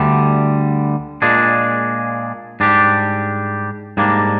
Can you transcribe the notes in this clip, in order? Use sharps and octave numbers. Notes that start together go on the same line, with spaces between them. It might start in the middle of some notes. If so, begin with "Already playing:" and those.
Already playing: D2 D3 G3
A#2 G#3 D4 G#4
G#2 G3 D4 G4
G#2 G3 A#3 D4